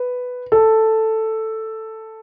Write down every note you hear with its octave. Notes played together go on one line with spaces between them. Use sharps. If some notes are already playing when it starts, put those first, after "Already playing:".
Already playing: B4
A4